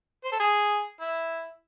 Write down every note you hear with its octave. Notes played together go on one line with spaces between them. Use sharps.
C5
A4
G#4
E4